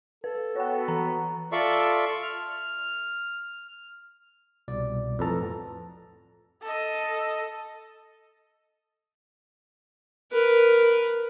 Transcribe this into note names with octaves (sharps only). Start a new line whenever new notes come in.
A4 B4
B3 F#4 C#5 G5
E3 A#5
F4 A4 D5 E5 C6 C#6
F6
C2 B2 D5
F2 A2 A4 B4 A#5
A4 D#5
A#4 B4